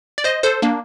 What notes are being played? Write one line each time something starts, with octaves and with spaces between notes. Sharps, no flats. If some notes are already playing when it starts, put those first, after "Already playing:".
D5
C5 D#5
A4 C5
A#3 D4